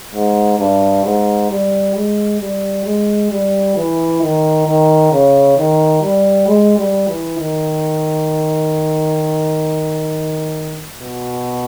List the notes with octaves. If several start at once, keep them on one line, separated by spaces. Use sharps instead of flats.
G#2
G2
G#2
G3
G#3
G3
G#3
G3
E3
D#3
D#3
C#3
D#3
G3
G#3
G3
E3
D#3
B2